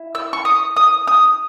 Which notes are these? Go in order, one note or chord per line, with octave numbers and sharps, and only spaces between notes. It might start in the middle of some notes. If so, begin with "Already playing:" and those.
Already playing: E4
E6
C#6
D#6
D#6
D#6